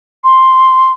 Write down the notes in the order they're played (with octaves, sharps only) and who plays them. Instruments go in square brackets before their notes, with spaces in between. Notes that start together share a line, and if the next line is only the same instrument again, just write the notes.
[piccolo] C6